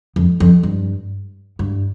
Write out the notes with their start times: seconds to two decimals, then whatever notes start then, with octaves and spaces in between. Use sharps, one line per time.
0.16 F2
0.40 F2
0.63 G2
1.59 G2